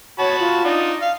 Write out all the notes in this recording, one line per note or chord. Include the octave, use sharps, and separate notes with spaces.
F#4 C#5 A5 B5
F4
D4 D#4
F5